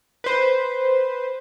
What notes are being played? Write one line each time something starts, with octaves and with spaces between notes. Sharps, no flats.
B4 C5